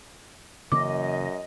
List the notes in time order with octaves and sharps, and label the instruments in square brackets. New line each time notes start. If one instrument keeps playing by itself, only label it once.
[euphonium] F#2 [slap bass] C#3 E3 A#3 [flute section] D#5 [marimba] D6